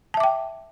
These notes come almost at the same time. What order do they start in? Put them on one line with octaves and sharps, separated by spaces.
A5 E5 D6 G5